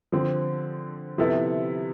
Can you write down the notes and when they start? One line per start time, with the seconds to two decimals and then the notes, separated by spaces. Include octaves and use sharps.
0.12 D3 F3 C4
1.18 C3 F3 B3 E4 A4